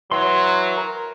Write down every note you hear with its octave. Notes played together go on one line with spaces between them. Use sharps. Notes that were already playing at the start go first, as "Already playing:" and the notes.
E3 F#3 C6
A#4